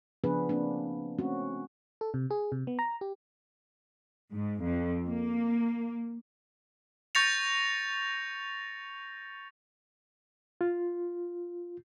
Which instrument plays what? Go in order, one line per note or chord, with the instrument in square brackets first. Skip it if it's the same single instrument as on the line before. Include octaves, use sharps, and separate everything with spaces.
[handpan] C#3 F3 B3 D4 G#4 B4
A#3 C4 D4
A3 C4 C#4 F#4
[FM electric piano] A4
C3
G#4
C3
B3
A#5
G4
[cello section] G#2
F2
A#3
[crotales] C#6 G6 A6 A#6 C#7 F7
[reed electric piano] F4